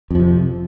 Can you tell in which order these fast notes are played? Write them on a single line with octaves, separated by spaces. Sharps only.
F2 F3 C3